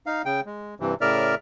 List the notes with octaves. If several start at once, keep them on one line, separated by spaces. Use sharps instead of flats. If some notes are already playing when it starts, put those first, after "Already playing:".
D#4 F5
C#3 G5
G#3
G2 C3 E3
A2 C#3 A#4 D5 E5 F6